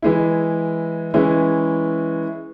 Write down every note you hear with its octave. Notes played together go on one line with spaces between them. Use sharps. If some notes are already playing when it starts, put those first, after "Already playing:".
E3 G#3 E4
E3 G#3 C#4 E4